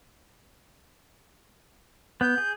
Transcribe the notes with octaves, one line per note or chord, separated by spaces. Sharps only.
B3 G6
G#4